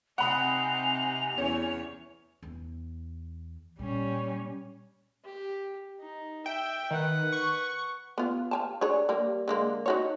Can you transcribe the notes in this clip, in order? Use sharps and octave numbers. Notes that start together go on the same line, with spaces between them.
C3 C4 D#4 F#5 G#5 B5 D#6 F7
E2 C#4 C#5
E2
A#2 G3 C#4
G4
D#4
E5 G5
D#3 B4 F#5
C#6
B3 F4
F5 G#5 A5
D4 G#4 C#5
G3 A#3
D3 G#3 A#3
D#4 F#4 C#5